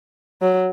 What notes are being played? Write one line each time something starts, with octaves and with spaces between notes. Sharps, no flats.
F#3